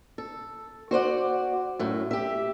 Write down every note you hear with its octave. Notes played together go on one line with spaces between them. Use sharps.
A4
F#4 C5 D5 F#5
F#2 A2
G4 E5